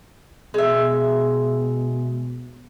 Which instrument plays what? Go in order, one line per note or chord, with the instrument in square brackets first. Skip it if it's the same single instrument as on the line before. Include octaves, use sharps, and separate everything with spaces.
[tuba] B2 [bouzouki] G#3 E5